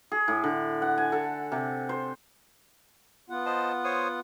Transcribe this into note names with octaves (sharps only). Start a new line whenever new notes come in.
G#4
A2
D3
F#5
G#5
A4
C3
C5
B3 F4 F#5
C5 D#5 A5
C5 C#5 D#6